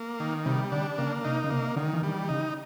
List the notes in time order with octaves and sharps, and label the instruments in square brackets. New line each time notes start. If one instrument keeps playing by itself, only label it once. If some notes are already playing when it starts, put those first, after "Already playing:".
Already playing: [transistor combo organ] A#3
D#3
[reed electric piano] C3 [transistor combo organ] G3
[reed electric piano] D3 [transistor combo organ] D4
[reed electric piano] C#3 [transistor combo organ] A#3
[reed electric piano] C3 [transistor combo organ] D#4
[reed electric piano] C#3
[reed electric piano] C3 [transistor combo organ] A#3
[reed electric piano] D3 [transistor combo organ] D#3
[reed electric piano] E3
[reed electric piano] D#3 [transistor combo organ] G3
[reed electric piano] C#3 [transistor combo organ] D#4